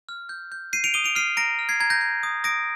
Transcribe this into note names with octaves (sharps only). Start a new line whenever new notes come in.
F6
G6
G6
G6 C7 D#7
D7 F7
D#6 D#7 G7
D7 F7
F6 C7 D#7
A#5 A#6 D7
F6
G#6 C7
A#5 G#6
G6 A#6
G6
D#6
D#6 A#6 D7